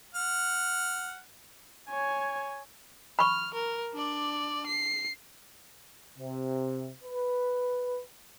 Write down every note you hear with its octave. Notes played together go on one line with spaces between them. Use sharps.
F#5 F6
C#5 G#5
B5 C#6 F6
A#4
D4 D5
C7
C3
B4